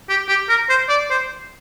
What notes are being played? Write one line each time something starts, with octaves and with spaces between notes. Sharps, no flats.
G4
G4
A#4
C5
D5
C5